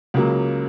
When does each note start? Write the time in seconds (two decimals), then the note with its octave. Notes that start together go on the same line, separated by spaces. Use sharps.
0.14 C#2 C#3 F#3 A#3